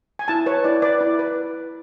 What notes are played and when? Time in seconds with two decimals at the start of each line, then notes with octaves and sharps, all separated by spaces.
0.19 G#5
0.28 E4 A5
0.46 B4 C#5
0.64 E4 D5
0.82 B4 D5
1.01 E4
1.19 B4